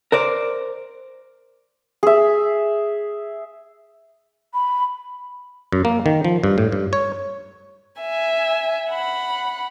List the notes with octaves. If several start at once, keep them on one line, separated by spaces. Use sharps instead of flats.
A#4 C5 D5
G#4 E5
B5
F#2
A#3
D#3
F3
G2
A2
G2
C#5
E5 G#5
F#5 B5